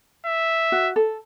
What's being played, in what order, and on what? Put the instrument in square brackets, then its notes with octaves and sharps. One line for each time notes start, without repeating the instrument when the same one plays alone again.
[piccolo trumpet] E5
[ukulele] F#4
A4